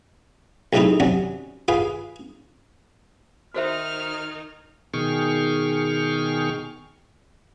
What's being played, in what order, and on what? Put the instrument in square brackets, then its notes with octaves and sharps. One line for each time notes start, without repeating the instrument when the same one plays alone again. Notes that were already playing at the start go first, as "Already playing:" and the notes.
[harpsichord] B1 G#2 C3 A3 D#4 E4
C3 F#3 C#4 D4
F4 G#4 B4 F5
[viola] D#3 D#4 [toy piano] F#4 C5 E5 [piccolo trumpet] F6
[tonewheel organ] B2 D#3 G#4 G5 C#6 F6